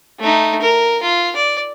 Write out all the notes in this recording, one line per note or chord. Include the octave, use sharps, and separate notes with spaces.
A3 D#4
A#4
F4
D5